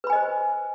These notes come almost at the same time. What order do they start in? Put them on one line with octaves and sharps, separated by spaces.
B4 B5 G#5 D#5 C5